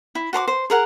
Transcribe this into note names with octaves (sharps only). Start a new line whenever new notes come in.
E4
F#4 C5 A#5 D6
C5
G#4 A#4 F#5